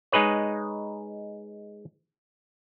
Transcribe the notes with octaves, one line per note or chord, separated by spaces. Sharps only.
G#3 D#4 G#4 B4 C#5